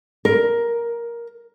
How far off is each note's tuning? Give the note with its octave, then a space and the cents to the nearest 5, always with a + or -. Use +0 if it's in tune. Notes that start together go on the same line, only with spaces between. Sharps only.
A#4 +10